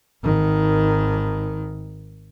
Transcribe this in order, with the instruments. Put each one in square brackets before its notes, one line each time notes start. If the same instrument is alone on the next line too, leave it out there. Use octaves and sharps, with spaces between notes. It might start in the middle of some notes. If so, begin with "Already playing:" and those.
[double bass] G#1 D#3